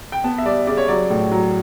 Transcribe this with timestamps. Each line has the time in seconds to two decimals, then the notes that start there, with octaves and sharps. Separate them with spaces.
0.12 G5
0.24 B3 A5
0.38 E5
0.45 G3 D5
0.67 C#3 D5
0.77 C#5
0.88 F#3 D5
1.10 A2
1.32 F#3